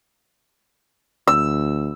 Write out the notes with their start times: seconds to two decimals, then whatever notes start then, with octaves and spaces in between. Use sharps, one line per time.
1.27 D2 E6